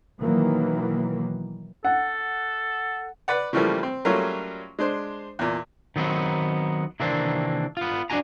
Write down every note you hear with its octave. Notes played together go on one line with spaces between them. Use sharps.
B2 D#3 E3 F#3 A#3
A4 F#5
B4 D5 F#5
C#3 E3 F3 G3 A3 A#3
C4
F#3 G3 A3 A#3 C#4 F4
G#3 D4 C5
E2 A#2
D#3 F#3 B3 C4 D#4
C3 D#3 E3 A#3 C4 D4
B3 F4
D4 E4 F#4 G#5 A#5